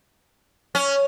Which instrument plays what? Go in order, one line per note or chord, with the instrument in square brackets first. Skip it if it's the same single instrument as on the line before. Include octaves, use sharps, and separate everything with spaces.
[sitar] C#4